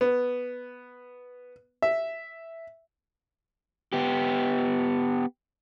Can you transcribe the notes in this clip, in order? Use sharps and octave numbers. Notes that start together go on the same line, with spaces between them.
B3
E5
B3 G4